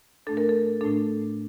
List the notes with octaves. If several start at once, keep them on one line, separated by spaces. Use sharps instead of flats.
A2 A3 D4 A4
A#4
A4
A2 A3 D4 A4